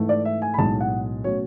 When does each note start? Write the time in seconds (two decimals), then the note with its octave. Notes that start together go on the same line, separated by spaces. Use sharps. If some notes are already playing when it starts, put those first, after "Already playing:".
Already playing: G#2 E3 A3
0.09 D5
0.25 E5
0.42 G#5
0.54 B5
0.58 B1 A2 G#3 A5
0.81 F#5
1.24 B2 F#3 A3 C#4 C#5